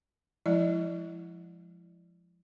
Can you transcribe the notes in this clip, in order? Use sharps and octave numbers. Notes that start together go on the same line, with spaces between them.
F3 G#3 E4 D5